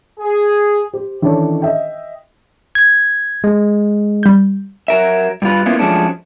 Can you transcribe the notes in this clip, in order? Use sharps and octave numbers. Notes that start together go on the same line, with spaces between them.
G#4
G4 C5
D#3 E3 C#4 D4 A4 C#5
D#5 E5 G5
G#6
G#3
G3 G6
F#3 A#4 E5
G2 G3 F4 B4
A#3 B3 C#4 E4 F4
F3 F#3 G#3 A3 C#4 D4